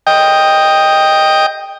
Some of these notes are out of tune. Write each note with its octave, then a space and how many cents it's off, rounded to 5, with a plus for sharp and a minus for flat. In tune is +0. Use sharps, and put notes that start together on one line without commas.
D#5 +0 G5 +10